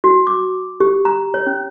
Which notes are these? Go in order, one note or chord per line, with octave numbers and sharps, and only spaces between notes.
F#4
D6
G4
A#5
C#5
C#4